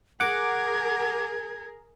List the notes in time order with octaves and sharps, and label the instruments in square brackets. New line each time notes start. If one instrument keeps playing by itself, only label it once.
[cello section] G#4 A#4 [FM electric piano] F#5 D6 [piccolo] G#6